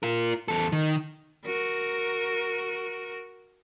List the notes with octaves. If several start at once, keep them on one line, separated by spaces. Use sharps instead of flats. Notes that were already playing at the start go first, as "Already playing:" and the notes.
F4 A#4
E2 A4
D#3
F#4 A#4